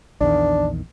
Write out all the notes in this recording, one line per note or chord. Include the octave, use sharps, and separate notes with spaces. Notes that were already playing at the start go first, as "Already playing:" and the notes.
A#1 E2 D#3 D4